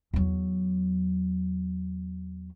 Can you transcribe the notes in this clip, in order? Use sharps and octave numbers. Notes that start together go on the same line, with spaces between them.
E2 F#3